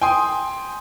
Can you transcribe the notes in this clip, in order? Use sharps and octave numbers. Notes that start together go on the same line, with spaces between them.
G5 G#5 C6 D#6